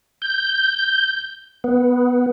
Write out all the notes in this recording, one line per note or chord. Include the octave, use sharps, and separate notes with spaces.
G6
B3